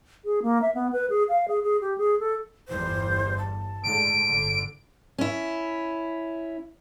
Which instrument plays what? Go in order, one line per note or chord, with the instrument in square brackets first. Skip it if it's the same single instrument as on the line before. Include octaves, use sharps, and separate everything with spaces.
[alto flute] G#4
A#3
E5
B3
B4
G#4
F5
G#4
G#4
G4
G#4
A4
[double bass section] G1 E2 G3 [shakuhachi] C5
[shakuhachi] A5
[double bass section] A2 D3 G#3 [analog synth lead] D7
[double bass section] G1 D3
[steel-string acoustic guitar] C#4 E4